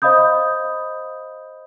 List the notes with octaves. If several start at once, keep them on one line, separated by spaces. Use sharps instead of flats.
C5 D#5 F5 B5 D#6 G6